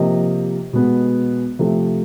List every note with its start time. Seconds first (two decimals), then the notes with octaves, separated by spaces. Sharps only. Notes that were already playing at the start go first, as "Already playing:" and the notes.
Already playing: C3 F3 A#3 D#5
0.73 B2 G#3 B3
1.59 C3 F3 A3